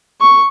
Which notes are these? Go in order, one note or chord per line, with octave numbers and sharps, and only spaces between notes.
C#6